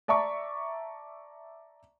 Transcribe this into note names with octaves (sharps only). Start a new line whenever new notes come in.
D5 E5 A5 A#5 C#6 D6